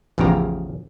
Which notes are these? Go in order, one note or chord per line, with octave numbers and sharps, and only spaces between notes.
A1 E2 C#3 F3 G4 A#5